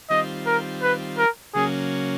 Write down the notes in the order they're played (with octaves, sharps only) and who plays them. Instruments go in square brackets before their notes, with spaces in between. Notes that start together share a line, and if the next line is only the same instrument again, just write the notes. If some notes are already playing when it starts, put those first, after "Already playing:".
[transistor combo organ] D#3 G3 C4 F4 [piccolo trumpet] D#5
[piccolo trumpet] A#4
B4
A#4
[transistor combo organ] C#3 F#3 A#3 C#4 [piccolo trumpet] G#4